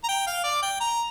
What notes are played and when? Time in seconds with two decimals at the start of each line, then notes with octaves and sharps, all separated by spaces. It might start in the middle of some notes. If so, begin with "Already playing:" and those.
0.04 A#5
0.08 G5
0.27 F5
0.44 D5
0.62 G5
0.80 A#5